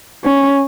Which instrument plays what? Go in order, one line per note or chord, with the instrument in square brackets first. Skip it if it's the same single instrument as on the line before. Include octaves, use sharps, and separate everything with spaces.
[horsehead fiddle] C#4